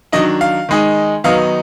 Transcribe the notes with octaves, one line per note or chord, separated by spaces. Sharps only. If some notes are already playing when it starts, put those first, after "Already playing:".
D#3 F#3 D4 D#5
F5
D#3 G#3 D#4
D#3 F#3 B3 D#4 F5